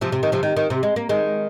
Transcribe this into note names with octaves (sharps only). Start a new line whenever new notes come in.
C3 F3
C3
D#3
C3 F3
D#3
D#3
C3
G#3
A#3
D#3 G#3